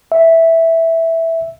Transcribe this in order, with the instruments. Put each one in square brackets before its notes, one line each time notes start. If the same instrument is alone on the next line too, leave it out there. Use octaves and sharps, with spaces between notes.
[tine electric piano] E5